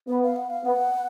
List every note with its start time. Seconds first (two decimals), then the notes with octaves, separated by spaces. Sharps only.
0.08 B3 F#5
0.23 F5
0.36 F#5
0.50 F5
0.64 B3 F#5